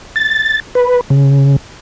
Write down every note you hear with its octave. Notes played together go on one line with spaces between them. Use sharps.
A6
B4
C#3